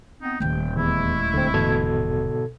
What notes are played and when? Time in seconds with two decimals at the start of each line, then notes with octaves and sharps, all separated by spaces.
0.20 B3 C4 D#4
0.40 D#1 D#3 F#3 A3 G5
0.77 E2 D#3 G#3 A3 E4
1.34 D2 D3 C4
1.54 G#2 B2 D3 E3 A4 G#6